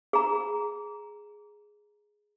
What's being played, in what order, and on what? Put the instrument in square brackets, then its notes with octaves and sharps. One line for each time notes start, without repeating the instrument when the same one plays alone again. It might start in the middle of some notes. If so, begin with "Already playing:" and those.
[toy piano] G#4 A#5